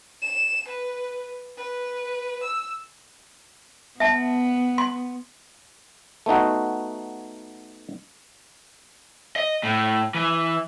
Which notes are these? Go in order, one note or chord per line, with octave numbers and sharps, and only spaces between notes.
E7
B4
B4
E6
B3 E5 A5
C6
A3 B3 D#4 F#4
D#5
A2
E3